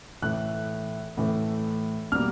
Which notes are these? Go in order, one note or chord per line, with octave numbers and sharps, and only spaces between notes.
A2 E3 A3 F#6
A2 E3 A3
B2 G3 A#3 F6